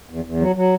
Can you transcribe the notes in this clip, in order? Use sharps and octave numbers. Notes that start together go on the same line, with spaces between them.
E2
E2
F#3
F#3